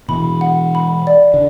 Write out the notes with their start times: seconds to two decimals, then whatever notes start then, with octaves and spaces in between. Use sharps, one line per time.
0.09 B2 E3 B5
0.41 F#5
0.75 B5
1.07 D5
1.34 D3